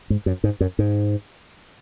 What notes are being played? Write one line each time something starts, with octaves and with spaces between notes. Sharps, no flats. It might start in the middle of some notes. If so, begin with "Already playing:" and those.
G#2
F#2
G#2
F#2
G#2